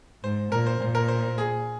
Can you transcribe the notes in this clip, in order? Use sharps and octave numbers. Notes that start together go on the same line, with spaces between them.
G#2 C5
A#2 A#4
C5
A#2 C5
A#4
C5
G#4